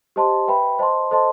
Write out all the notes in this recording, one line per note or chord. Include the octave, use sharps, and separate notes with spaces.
G4 C5 D#5 A5 C6
B4 E5 G5 B5
C5 D#5 A5 C6
A4 C5 D#5 A5 C6